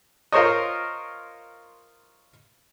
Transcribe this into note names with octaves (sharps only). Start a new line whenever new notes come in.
F4 A#4 C5 C#5 D#5